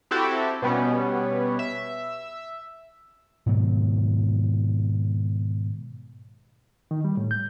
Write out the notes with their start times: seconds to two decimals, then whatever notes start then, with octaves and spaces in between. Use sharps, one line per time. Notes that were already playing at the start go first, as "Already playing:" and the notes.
0.11 C4 E4 F#4 G4 A4
0.62 B2 G3 B3 C#4
1.59 E5
3.46 G#2 B2 D#3 F#3
6.91 D#3
7.05 G3
7.17 A2
7.31 G6